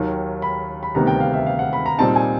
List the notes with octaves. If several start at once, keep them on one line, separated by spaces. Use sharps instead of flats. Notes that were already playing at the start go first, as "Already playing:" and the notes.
Already playing: D#2 D#3 F#3
B5
B5
D2 C3 D#3 G3 B3 A#5
G5
F5
E5
F5
F#5
B5
A#5
A#2 G3 C4 D#4 A5
G#5